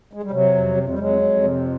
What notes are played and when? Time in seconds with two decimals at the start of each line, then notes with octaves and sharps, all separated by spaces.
0.13 G#3
0.23 G3
0.31 C3 F#3
0.54 F2
0.76 F2
0.89 G3
0.99 F2 F#3 G#3
1.22 F2
1.43 C3